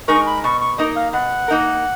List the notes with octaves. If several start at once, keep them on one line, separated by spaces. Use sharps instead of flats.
G#3 D#4 A#4 C#6
B5
B2 C#6
C#6
A#3 D#4 A#4 D#5
F5
B2 F#5
A#3 D#4 A#4